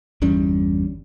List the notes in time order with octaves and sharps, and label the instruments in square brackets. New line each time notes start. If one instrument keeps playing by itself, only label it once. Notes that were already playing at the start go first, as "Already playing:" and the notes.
[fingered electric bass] G1 E2 G3 C#4